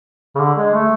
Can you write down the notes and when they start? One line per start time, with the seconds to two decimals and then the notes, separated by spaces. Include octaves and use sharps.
0.35 C#3
0.40 D3
0.57 G#3
0.74 A3